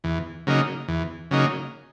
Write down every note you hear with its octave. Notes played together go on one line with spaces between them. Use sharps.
E2
C#3 F#3 A#3 D#4
E2
C#3 F#3 A#3 D#4